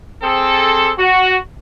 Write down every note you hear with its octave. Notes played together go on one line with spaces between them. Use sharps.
C4 G#4 A4
F#4